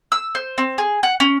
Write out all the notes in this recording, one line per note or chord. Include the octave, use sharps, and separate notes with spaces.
E6
C5
C4
G#4
F#5
C#4